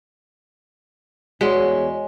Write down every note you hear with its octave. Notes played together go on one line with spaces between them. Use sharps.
E2 G#3 F#4 C#5 D5 F#5